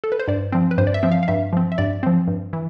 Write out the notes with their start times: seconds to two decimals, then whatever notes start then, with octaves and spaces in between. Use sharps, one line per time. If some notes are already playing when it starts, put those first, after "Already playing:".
0.04 A4
0.12 B4
0.20 C5
0.28 G2 D5
0.52 F3 C4
0.71 B4
0.78 G2 C5
0.87 D5
0.94 E5
1.03 F3 C4
1.12 F5
1.23 F5
1.28 G2 E5
1.53 F3 C4
1.72 E5
1.78 G2 D5
2.03 F3 C4
2.27 G2
2.53 E3